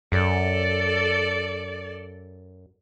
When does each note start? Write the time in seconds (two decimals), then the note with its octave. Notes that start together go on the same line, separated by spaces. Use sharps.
0.12 F#2 A4 D5